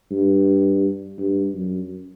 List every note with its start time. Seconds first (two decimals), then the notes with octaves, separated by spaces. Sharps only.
0.11 G2
1.18 G2
1.54 F#2